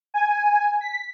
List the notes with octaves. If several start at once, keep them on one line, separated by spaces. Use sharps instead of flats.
G#5
B6